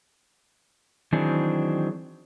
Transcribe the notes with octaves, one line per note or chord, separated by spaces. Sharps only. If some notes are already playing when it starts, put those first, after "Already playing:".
D#3 E3 F#3 C4 D4 G#4